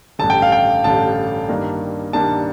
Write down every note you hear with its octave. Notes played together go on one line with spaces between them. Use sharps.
A1 G2 D3 A5
G5
F5
G5
A1 G2 D3 A5
G2 D#3 A#3 D4
G2 D#3 A#3 D4 A5